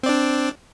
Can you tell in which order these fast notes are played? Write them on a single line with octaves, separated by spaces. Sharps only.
C4 D5 D4